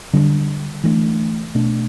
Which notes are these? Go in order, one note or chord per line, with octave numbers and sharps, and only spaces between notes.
D3 G3 B3 D4
E3 A3 D4
B2 A3 D4